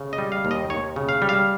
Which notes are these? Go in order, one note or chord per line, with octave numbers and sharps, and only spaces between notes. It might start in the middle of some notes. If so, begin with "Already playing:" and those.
Already playing: C#3
D#5
G3
F5
D#2
D#5
D#2 C#5
C#3
F5
G3
F5